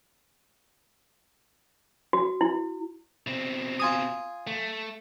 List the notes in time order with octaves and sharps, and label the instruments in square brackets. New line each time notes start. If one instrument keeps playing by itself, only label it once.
[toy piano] F#4
E4
[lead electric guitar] B2 C4
[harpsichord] F4 G#5 D#6
[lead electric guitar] A3